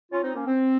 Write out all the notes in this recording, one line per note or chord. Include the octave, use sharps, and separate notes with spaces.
C#4 F4
C4 D#4
A#3 C#4
C4